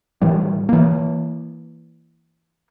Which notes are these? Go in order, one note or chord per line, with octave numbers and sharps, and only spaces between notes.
A2 D#3 E3 G3
E3 A#3